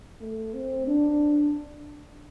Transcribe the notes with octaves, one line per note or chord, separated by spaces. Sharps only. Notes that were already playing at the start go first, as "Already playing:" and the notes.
A3
C4
D4